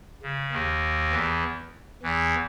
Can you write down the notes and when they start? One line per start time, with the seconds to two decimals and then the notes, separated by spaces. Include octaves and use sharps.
0.22 C#3
0.52 D#2 D#3
1.12 E2 E3
2.03 E2 E3